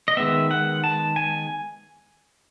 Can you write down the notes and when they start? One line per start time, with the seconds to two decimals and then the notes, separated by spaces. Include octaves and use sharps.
0.08 D#5
0.17 D#3 G#3 B3 E5
0.51 F#5
0.84 A5
1.16 G#5